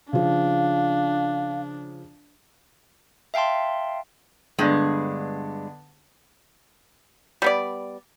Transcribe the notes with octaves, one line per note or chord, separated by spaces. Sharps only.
C#3 F3 D4 F5
E5 F5 G5 A5 C6
G2 D3 G#3 B3 D4
G3 B3 D5